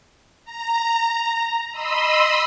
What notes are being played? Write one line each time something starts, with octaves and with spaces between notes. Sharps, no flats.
A#5
D#5 B5 C6 D#6 E6